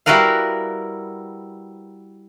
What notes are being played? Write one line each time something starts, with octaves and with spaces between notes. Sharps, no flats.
G3 E4 F#4 A#4 B4 F5